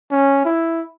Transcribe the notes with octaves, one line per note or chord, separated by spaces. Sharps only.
C#4
E4